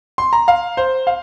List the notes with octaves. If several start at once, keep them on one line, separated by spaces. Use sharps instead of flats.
C6
A#5
F5
C5
F5